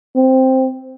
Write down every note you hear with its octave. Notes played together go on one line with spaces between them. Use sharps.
C4